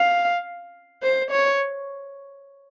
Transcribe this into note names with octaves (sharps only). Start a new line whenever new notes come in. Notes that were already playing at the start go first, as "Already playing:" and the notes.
Already playing: F5
C5
C#5